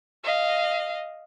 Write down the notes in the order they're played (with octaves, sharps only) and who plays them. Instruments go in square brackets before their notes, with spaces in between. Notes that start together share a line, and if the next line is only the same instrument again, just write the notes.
[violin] D#5 F5